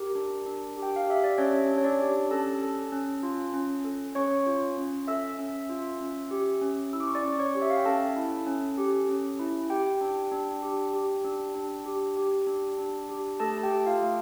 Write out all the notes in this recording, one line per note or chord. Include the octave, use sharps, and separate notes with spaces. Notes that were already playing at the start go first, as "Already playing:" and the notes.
Already playing: G4 A#4
D4
D4
G4
G5
F5
G4 E5
D5
C#4 D4 C#5
D4
C#5
D4 D5
G4
C#4 A4 A5
A4
C#4
F4
C#4
A4
C#4 C#5 C#6
F4
C#4
A4 E5 E6
C#4
F4
C#4
G4
C#4
E4 E6
D6
C#6
D5 D6
C#4
C#5 C#6
G4
E5
F5
G5
C#4 A4 A5
E4
C#4
G4
C#4
E4
G4 G5
D4
D4
G4
G4
D4
D4
G4
G4
D4
D4
G4
A3 A4 A5
A5
G4 G5
A4
F4 F5
A3